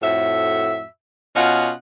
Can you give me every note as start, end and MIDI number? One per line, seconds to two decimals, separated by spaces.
0.02 0.84 41
0.02 0.84 45
0.02 0.84 66
0.02 0.84 76
1.36 1.71 47
1.36 1.71 61
1.36 1.71 65
1.36 1.71 75
1.36 1.71 78